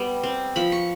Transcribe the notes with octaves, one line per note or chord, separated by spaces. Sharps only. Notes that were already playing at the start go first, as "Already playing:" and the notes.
Already playing: G3 B3
C4
F3 B5
C#6